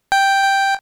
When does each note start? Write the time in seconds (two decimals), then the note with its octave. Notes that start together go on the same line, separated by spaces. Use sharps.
0.12 G5
0.43 G5